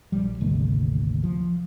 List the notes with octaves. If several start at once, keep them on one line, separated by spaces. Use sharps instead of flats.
A#1 F3 G3
G#1 D2 C3 A#3
F3